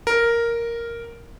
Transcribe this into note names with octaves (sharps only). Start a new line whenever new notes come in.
A#4